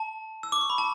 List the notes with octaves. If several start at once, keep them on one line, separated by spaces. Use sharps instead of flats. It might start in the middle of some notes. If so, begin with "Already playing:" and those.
Already playing: A5
E6
D6
C#6
B5
A5